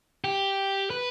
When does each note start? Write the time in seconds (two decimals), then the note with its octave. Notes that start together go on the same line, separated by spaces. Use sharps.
0.24 G4
0.90 B4